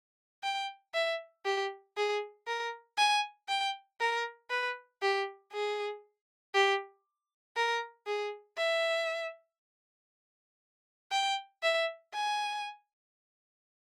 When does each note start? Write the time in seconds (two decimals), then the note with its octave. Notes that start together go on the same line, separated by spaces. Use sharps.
0.43 G5
0.94 E5
1.45 G4
1.97 G#4
2.48 A#4
2.98 G#5
3.49 G5
4.01 A#4
4.50 B4
5.02 G4
5.53 G#4
6.54 G4
7.56 A#4
8.07 G#4
8.58 E5
11.12 G5
11.63 E5
12.14 G#5